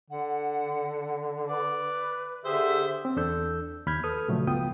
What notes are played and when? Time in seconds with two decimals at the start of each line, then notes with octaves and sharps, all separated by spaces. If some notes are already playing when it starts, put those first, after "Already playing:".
0.10 D3 F#5
1.49 B4 D5
2.45 D3 G4 G#4 C5 E5
3.05 C4
3.16 E2 D4 A4 E6 G6
3.87 D#2 B5 F6 G6 G#6
4.03 A4 B4 D#6 F6
4.28 A#2 C#3 F3 F#3 A3
4.47 C#2 G2 B3 F4 G5 D#6